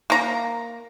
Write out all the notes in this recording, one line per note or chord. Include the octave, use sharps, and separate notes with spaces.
A#3 A#5